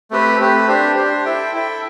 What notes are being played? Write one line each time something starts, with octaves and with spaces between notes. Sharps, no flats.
A3 C4 G4 B4
A3 C4 G4 B4
D4 G4 C5
D4 G4 C5
E4 A4 E5 G5
E4 A4 E5 G5